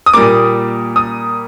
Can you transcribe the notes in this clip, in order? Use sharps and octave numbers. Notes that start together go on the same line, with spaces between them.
D#6
A#2 G3 A#3 D6
D#6